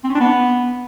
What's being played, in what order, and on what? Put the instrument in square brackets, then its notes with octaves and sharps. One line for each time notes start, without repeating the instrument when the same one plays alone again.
[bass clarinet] C4
C#4
D4
B3